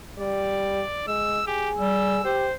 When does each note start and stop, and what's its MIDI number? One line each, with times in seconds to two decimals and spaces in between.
0.19 0.83 55
0.19 1.06 74
1.08 1.40 56
1.08 1.44 88
1.47 1.69 67
1.47 2.21 68
1.78 2.19 55
1.78 2.34 88
2.25 2.47 67
2.25 2.54 72